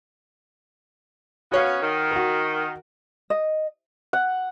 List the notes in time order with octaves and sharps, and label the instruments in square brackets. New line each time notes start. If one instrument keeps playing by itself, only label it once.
[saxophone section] B3 C#4 [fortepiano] F#4 C#5 F5
[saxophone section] D#3
[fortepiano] F#4 A#4
[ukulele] D#5
[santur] F#5